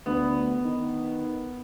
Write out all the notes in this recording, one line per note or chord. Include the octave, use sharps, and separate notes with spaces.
D2 B3
D#3